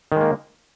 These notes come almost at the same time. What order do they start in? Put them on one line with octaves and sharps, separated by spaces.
D#3 G#3 A#3